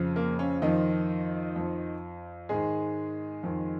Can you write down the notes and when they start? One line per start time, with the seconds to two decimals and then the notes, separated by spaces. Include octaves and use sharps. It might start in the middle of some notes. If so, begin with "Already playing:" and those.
Already playing: F2 C#3 F3
0.16 A#3
0.39 C#4
0.62 F2 D#3 F3 D#4
1.56 F2 F3
2.49 G#2 D#3 G#3 G#4
3.43 F2 D#3